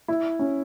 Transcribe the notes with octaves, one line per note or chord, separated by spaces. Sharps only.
E4
C#4